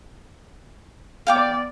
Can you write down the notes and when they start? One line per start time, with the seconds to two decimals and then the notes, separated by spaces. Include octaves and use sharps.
1.27 B3 D5 F5 G5 D6